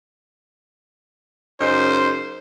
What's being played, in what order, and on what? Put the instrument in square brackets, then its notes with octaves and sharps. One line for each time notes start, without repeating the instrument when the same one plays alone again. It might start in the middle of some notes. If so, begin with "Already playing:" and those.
[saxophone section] F#2 C#3 D#4 [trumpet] C5